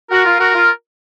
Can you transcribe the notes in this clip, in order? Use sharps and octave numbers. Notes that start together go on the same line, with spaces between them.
F#4 A#4
F4
F#4 A#4
F4